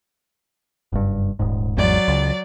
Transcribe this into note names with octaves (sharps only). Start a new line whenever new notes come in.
F#1 G2
D#1 G#2
G#1 E2 G#2 F#3 D5 A6
C#2